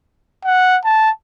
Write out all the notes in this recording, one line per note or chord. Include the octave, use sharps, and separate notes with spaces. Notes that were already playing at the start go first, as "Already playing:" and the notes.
F#5
A5